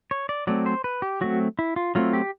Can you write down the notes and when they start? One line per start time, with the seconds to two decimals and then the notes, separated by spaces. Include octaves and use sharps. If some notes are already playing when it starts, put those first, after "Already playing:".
0.11 C#5
0.29 D5
0.47 F#3 A3 C4 D5
0.66 C5
0.84 B4
1.02 G4
1.21 F#3 A3 C4 F#4
1.59 E4
1.76 F4
1.95 F#3 A3 C4 F4
2.13 G4